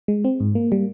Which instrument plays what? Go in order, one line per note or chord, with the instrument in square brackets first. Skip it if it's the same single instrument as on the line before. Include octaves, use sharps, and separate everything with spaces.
[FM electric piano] G#3
C4
G#2
A#3
G3